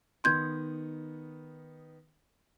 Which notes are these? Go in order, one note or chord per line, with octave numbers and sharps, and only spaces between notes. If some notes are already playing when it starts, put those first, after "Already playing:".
D#3 B3 D#4 C6 G6 G#6